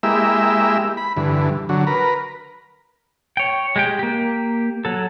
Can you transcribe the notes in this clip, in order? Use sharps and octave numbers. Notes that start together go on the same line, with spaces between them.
G#3 A#3 E4 G4 E5
B5
G2 D3 E3
D3 F#3
A#4 B4
C#5 G5
G#3 G4 G5
A#3 G4
F#3 A4